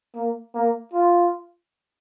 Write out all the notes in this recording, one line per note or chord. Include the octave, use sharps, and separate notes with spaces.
A#3
A#3
F4